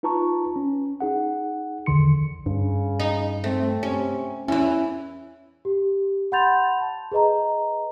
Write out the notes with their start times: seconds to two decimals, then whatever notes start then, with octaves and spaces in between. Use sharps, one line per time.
0.03 D#4 F4 B4 A5 A#5 C#6
0.56 C#4
1.01 D#4 G#4 F#5
1.86 A#1 E2 D3 D#3 C6 C#7
2.46 G2 C#3
3.00 D#4
3.44 A3 C4
3.83 C3 C#4
4.48 E2 E3 C#4 E4
5.65 G4
6.32 F#5 B5 C6 G6 A6 F7
6.80 A5
7.12 G#4 B4 D#5 A#5